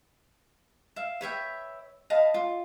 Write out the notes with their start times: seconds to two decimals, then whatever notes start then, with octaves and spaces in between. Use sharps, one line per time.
0.96 E5 F5
1.21 B4 C#5 E5 G5
2.10 D#5 F5 A5 B5
2.34 F4